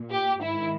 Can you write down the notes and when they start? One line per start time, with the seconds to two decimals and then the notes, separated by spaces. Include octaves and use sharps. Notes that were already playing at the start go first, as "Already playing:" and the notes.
Already playing: A#2
0.10 G4
0.41 G#2 D#3 E4